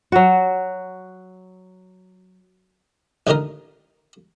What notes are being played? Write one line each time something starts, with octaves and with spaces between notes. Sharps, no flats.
F#3 F#4
A1 D3 D#3 D#4 A#4